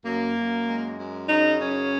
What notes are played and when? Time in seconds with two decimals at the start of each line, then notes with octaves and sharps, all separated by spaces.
0.04 F#2 A#3
0.36 F#2
0.66 G#3
0.97 F#2
1.28 C#3 D#4
1.59 F#2 C#4